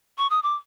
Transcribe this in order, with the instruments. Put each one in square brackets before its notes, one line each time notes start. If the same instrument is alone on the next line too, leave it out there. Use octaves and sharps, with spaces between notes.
[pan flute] C#6
D#6
D6